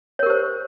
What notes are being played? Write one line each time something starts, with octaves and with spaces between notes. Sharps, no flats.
G4 A#4 C5 C#5